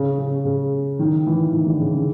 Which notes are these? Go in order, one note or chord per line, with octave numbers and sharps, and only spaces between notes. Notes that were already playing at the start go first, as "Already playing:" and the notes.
Already playing: C#3
C#3
C#3
D#3
E3
D#3
D3
C#3
C#3